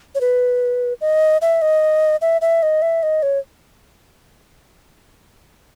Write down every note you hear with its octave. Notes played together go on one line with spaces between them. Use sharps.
C#5
B4
D#5
E5
D#5
E5
E5
D#5
E5
D#5
C#5